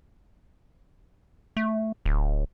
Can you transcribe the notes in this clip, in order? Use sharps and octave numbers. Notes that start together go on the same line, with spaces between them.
A3
D1